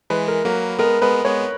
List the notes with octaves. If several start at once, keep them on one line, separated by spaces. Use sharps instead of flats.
E3 G#3 B4
A#4
F#3 A#3 A#4
G#3 B3 A#4
G#3 B3 B4
G#3 B3 C#5